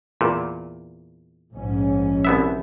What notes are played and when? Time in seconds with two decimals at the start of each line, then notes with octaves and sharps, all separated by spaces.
0.21 E2 A#2
1.54 A#1 G#2 C#4
2.25 C2 B3 E5